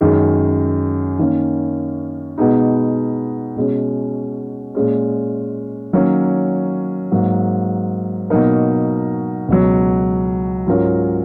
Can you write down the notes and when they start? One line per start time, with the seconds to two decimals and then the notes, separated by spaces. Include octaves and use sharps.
0.01 F#2 D#3 G#3
1.19 D#3 A#3 C#4
2.38 B2 G#3 B3 D#4
3.56 B2 G#3 C#4
4.75 A#2 G#3 C#4
5.93 D#3 F#3 A#3 C#4
7.11 G#2 F#3 A#3
8.30 B2 F#3 A#3 D#4 A#4
9.48 C#2 B2 F#3
10.67 G#2 F#3 C#4 F4 A#4